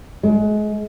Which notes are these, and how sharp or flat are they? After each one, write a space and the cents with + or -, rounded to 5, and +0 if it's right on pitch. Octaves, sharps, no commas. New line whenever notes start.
G#3 +30